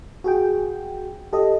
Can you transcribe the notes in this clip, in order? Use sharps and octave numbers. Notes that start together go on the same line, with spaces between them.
F#4 G#4 G5
G4 A4 D#5